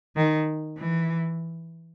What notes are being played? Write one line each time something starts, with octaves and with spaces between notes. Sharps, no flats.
D#3
E3